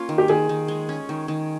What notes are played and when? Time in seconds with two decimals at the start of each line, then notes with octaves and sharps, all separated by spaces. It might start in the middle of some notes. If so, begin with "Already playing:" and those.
Already playing: A#3 C#4 F4
0.09 D#3
0.18 G4
0.28 D#3 G#4
0.49 D#3
0.68 G#3
0.89 C#4
1.09 D#3
1.28 D#3